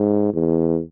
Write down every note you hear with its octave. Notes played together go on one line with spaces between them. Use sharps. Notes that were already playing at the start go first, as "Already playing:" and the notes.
Already playing: G#2
E2